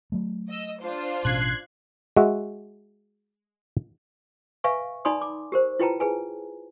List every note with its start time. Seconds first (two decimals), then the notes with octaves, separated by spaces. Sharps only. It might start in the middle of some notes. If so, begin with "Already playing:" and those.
0.12 F#3 A3
0.49 D#5 E6
0.79 D4 F4 C5
1.25 A1 B2 C#4 F#6 G#6 C7
2.16 G#3 F#4 E5
4.64 B4 E5 F5 G#5 C#6
5.05 D#4 D5 G#5 B5 C6 D#6
5.21 D6
5.52 G4 A#4 C5
5.79 E4 F4 B4 G5 A5 A#5
6.00 G#4 B4 G#5